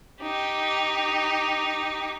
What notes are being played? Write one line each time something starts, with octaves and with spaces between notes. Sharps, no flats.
D#4 G4